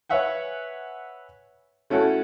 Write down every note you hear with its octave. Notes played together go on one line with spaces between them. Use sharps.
B4 C#5 E5 F#5 G#5
A3 C#4 E4 F#4 A4